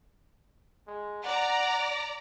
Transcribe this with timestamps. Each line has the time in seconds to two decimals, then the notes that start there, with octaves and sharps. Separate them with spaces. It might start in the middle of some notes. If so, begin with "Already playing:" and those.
0.87 G#3
1.25 D5 F#5 A#5